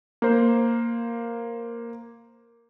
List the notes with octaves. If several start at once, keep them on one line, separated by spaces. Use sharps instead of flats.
A#3 C5